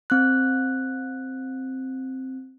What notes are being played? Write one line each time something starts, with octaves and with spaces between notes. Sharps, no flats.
C4 F#6